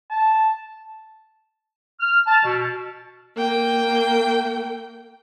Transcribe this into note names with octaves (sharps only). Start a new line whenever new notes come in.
A5
F6
A5
B2
A#3 G5